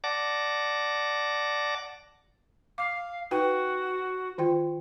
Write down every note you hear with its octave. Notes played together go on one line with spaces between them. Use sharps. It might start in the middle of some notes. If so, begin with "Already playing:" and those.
D5 F#5 A5 D6 A#6
F5 D6
D#4 F#4 B4 G5
D#3 F4 G5